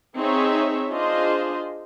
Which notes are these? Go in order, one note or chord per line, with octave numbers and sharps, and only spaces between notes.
C4 D#4 G#4 C#5 E5
D4 F4 G#4 C5 D#5